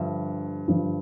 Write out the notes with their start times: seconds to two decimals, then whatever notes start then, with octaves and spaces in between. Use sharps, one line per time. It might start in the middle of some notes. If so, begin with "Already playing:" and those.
Already playing: G2 D3 F3 E5
0.68 G2 D3 F3